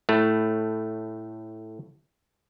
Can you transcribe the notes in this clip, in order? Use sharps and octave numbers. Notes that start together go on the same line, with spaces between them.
A2 A3